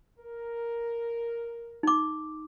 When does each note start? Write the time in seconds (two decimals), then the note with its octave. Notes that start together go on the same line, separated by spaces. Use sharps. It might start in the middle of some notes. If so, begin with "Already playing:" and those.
0.19 A#4
1.83 D#4 D6